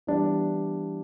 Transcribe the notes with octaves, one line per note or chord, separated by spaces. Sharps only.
E3 G3 B3 D4